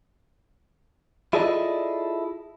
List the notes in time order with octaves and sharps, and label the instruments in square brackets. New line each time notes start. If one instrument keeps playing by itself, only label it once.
[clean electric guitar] E4 F4 G#4 A4 D5 D#5